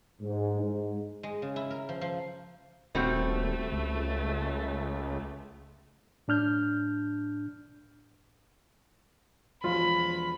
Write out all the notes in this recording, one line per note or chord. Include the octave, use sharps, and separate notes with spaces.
G#2
G#2
G#3
C#3
E4
A#4
F3
F3
D#1 G3 A3 C4 F#4
C#2
A2 D4 F6 G6
E1 F3 F4 B5